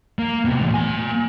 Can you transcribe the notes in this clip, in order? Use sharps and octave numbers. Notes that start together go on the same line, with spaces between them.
A#3
C3 B3
E2 A2
A#3 G#5